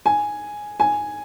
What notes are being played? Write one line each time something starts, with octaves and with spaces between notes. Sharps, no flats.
G#5
G#5